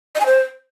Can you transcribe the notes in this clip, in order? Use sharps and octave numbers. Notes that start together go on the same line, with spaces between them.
D#5
G#5
C5